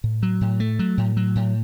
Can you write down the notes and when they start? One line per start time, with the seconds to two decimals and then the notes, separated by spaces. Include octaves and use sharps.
0.04 A2
0.23 F#3
0.41 A2
0.60 A3
0.79 F#3
0.97 A2
1.17 F#3
1.35 A2